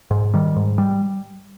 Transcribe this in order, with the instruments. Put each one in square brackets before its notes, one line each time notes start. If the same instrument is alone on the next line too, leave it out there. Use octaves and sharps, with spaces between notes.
[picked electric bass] G#2
D#3 G3
G#2
G3